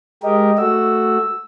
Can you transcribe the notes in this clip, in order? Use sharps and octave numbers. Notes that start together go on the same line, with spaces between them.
G#3 G4 A#4 D#5
A3 F#4 E6